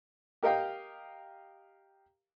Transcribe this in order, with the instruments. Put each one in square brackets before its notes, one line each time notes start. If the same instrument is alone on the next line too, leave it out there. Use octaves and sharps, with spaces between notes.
[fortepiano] G4 A#4 D#5 F5 G5 A#5